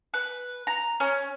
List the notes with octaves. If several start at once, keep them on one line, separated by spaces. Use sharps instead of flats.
B4
A#5
C#4